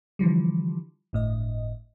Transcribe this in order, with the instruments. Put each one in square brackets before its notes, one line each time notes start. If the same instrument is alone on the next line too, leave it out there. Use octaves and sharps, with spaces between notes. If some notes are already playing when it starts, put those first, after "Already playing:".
[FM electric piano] D3 E3 F3 G3
G1 A2 D#5